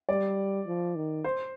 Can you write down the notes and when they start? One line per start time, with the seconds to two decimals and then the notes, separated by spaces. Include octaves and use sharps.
0.09 G3 D5
0.67 F3
0.96 D#3
1.24 C5